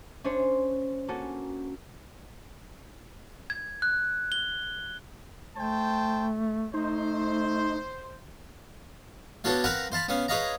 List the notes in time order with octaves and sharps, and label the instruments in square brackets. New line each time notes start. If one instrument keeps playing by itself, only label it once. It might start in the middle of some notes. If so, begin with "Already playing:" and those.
[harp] C#4 D4 C5 C#5
A#3 C#4 F#4 A4
[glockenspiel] G#6
F#6
G7
[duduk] A3 [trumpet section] C5 G5 A5
[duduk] A3 [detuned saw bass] D#4 [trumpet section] C5
[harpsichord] B3 D4 F#4 A4 C#5 F5
C4 A#4 B4 F5 F#5 A#5
C5 F5 A5 B5
B3 C#4 F5
G#4 B4 C#5 D#5 F5 A#5